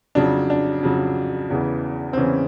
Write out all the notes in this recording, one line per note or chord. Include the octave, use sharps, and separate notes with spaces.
F2 C#3 F#3 D4
D4
F2 C#3 F#3
E2 C#3 E3
C4
E2 C#3 E3 C#4